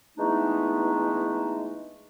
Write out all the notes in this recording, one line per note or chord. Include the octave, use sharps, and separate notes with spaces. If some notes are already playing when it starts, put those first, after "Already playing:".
E3 G#3 A3 B3 D4 D#4